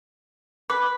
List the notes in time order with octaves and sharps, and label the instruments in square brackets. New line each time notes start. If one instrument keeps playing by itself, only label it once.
[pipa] B4 [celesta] D6